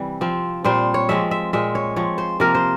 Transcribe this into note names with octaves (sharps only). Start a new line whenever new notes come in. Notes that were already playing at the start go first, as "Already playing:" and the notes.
Already playing: C3 E3 G3
F3 C4
A#2 G3 C4 C5
C#5
F3 G#3 C4 E5
E5
A#2 G#3 C4 E5
C#5
F3 C4 C#5
C5
C3 F3 A#3 A#4
C5